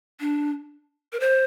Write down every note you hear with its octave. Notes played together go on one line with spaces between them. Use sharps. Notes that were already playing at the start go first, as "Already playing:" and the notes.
D4
A#4
C5